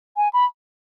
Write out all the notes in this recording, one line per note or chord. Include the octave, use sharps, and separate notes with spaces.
G#5
B5